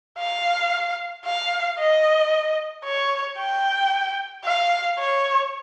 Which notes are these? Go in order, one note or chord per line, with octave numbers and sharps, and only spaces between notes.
F5
F5
D#5
C#5
G5
F5
C#5